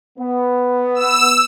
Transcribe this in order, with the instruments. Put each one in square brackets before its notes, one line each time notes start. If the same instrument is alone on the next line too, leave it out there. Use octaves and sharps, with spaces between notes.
[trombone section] B3
[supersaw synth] E6